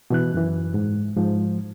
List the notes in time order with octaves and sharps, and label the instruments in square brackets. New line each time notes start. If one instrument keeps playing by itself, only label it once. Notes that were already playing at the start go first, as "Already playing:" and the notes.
[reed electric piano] B2 E3 F#6
F#2 E3
G#2
G#2 F3